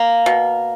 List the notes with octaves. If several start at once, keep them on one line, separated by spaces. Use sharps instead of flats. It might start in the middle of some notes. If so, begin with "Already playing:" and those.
Already playing: A#3
B2